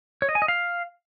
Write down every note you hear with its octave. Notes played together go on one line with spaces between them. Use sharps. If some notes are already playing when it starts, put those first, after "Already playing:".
C#5
D#5
G#5
D#5
F5